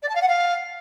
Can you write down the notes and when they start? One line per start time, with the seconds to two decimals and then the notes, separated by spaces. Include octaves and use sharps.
0.02 D5
0.08 A5
0.15 F5
0.21 F#5
0.28 F5